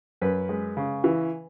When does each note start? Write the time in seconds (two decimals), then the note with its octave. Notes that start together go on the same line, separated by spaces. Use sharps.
0.22 F#2 B4
0.49 G#3
0.77 C#3
1.04 E3